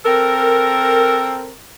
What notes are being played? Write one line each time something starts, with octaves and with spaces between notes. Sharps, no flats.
C4 A4 A#4